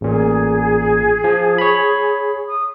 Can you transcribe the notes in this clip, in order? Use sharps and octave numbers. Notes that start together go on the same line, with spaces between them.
A1 A#2 G#4
F3
C#5 B5
D#6